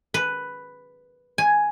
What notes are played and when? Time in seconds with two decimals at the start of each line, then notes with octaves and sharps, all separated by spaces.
0.14 B4
1.38 G#5